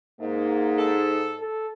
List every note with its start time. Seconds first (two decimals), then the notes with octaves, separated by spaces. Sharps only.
0.20 G#2 A#3 D#4
0.79 A4
1.40 A4